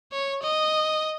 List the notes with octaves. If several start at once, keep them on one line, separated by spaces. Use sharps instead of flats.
C#5
D#5